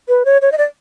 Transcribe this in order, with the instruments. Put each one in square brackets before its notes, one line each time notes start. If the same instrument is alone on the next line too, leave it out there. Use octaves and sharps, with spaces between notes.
[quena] B4
C#5
C#5
D#5
D5